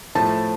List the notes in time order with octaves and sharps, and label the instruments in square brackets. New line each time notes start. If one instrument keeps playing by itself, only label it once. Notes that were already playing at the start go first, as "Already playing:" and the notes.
[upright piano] A2 F3 A3 [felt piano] A5